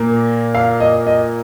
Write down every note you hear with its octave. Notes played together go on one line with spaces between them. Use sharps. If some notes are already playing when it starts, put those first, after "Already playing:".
Already playing: A#2 A#3
F5
D#5
D#5